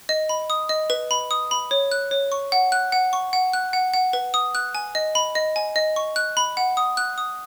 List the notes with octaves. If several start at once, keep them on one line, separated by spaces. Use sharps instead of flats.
D#5
B5
D#6
D#5
B4
B5
D#6
B5
C#5
F#6
C#5
C#6
F#5
F#6
F#5
C#6
F#5
F#6
F#5
F#5
B4
D#6
F#6
G#5
D#5
B5
D#5
G#5
D#5
C#6
F#6
B5
F#5
D#6
F#6
D#6